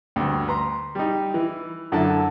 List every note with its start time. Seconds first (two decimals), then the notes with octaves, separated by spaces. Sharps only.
0.16 D2 G2
0.47 B4 A#5 C6
0.95 G3 D#4
1.34 E3
1.92 F#2 D3 E4 A4 A5